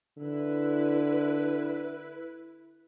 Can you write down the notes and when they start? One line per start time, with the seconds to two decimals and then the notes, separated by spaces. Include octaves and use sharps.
0.19 D3 E4 B4